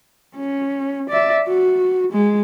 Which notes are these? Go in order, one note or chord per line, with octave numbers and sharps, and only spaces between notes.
C#4
D5 E5
F#4
G#3